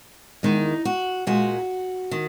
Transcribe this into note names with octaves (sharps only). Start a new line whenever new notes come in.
E2 D#3 G#3 D#4
F#4
A#2 G#3 F#4
D#3